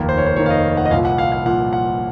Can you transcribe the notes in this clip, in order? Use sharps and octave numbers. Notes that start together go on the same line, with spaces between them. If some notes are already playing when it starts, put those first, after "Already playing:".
Already playing: F1 D#2 D#3 A#3
C5
C#5
C5
F1 D#2 D#3 A#3 C#5
F5
D#5
F#5
D#5
C2 A#2 F3 F5
F#5
F5
F5
C2 A#2 F3 F#5
F#5